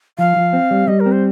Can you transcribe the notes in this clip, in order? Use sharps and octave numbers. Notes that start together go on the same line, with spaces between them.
F3 F5
F3
C4
G3
G3 D#5
A#4
C4
C5